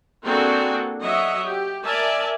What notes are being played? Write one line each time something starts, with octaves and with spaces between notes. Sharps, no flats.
A#3 C4 D4 F#4 G#4 A4
F#3 D#5 E5
G4
A#4 D5 E5 G#5 A5